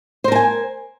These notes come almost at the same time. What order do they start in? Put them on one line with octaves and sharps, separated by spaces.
C5 A#4 A5 G#5